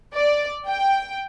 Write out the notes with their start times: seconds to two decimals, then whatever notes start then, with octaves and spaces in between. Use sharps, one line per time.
0.13 D5
0.66 G5